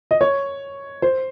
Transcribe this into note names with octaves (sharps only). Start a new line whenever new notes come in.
D#5
C#5
C5